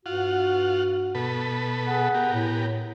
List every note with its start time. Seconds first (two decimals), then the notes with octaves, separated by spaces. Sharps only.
0.06 G2 F4 F#4 F#5
1.15 B2 A4 B4
1.86 G#4 F#5
2.14 B3 G4 A#4
2.33 A2